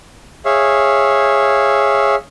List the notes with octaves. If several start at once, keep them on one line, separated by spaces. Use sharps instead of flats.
G#4 C#5 E5 F5